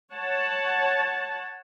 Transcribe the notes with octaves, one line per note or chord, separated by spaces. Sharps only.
C#5 F#5 A5